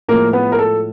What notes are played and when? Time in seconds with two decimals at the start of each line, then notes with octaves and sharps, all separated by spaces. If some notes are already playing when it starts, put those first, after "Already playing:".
0.08 A2 F3 G#3 A#3 A#4
0.33 B3 B4
0.52 A#4
0.59 A4